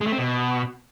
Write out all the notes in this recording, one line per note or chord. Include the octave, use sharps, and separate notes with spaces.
G#3
A3
C4
B2